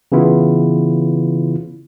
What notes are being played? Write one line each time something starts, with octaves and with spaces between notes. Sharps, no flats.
C#3 E3 B3 E4 F4